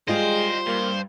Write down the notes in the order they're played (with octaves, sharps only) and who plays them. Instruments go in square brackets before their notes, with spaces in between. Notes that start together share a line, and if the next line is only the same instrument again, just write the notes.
[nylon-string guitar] G3 F4 G#4 [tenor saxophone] G#3 [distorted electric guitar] C5 [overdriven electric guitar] D#5 G5
[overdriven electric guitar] G2 [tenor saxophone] A#3